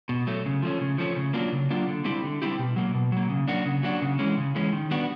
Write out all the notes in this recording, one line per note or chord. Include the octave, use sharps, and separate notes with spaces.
B2
F#3 A3
C#3
F3 A3 C#4
C#3
F3 A3 C#4
C#3
F#3 A#3 D4 F4
C#3
F#3 A#3 D4 F4
D3
G3 C4 E4 G4
D3
G3 C4 E4 G4
B2
F#3 A#3
B2
F#3 A#3
C#3
F#3 A#3 D4 F#4
C#3
F#3 A#3 D4 F#4
C#3
E3 G#3 C#4
C#3
E3 G#3 C#4
D#3
G3 B3 D4 F#4